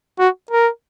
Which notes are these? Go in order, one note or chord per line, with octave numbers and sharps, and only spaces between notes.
F#4
A#4